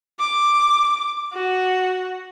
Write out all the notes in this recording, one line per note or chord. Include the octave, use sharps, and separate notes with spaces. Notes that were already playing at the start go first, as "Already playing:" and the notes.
D6
F#4